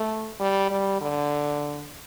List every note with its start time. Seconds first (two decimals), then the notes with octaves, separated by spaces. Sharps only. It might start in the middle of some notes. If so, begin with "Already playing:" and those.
Already playing: A3
0.40 G3
0.70 G3
1.01 D3